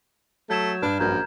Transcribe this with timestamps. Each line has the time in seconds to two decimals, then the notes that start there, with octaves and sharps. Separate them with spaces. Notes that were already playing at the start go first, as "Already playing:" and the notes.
0.50 F#3 A3 G6 G#6 E7
0.82 G2 D4 B4 F6
1.00 A#1 F#2 A#5 G6 G#6